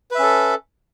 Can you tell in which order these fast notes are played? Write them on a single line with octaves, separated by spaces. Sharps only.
B4 E5 C#4 A4